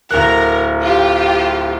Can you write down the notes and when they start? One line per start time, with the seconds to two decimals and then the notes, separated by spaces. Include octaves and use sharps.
0.11 D1 A#4 F#6
0.82 F4 G4